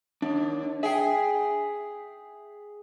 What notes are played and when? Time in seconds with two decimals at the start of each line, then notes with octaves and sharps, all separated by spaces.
0.22 D#2 D4
0.83 G#4 E5 G5